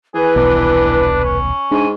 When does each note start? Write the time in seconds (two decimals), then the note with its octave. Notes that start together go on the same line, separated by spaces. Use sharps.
0.15 E3 G#4 B4
0.36 D#1 B1 D4
1.24 C#4
1.71 G#2 D4 G#5